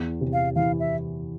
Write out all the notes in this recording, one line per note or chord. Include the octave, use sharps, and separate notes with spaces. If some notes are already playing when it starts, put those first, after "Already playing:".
Already playing: E2
C3
F5
E3 F5
E5